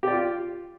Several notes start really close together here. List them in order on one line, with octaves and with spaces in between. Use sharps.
G4 D5 F4